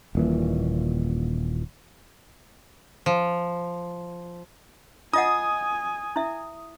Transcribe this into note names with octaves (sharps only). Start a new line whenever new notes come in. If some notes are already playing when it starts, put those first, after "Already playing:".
D#1 A#2 E3
F3
F4 D#5 F#5 G#5 D#6
E4 E5